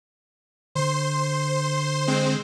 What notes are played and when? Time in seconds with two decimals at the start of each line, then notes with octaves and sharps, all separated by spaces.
0.75 D3 C5 C6
2.07 G#3 C4 C5